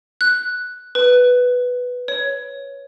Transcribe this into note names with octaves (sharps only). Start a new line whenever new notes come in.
F#6
B4
C#5